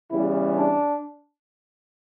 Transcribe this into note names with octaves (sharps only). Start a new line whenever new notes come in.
E2 C#3 G3 E4
D4